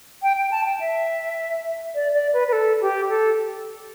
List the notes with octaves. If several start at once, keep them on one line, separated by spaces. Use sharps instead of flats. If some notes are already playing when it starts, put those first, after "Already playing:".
G5
G5
A5
G5
E5
D5
D5
B4
B4
A4
G4
A4